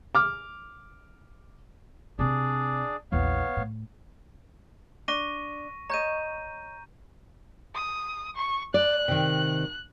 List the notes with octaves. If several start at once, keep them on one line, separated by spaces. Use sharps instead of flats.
D6 F6
C3 C4 D4 G#4 D5
A#1 E2 B3 C#5 F5
A2
D4 C#6 A#6 D#7
C#5 D#5 A#5 G6 D#7
D#6
C#6
D5 F#6
C3 D#3